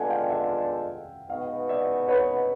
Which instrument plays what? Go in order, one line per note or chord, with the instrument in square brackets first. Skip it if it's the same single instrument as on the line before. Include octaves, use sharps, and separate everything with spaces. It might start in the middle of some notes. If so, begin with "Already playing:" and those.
Already playing: [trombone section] G#3 B3 D4 F4 A4 [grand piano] F#5 G#5
[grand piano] F5 G5
E5 F#5
[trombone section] B2 G#3 B3 D#4 F#4 [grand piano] D#5 F5
[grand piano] D5 E5
B4 C#5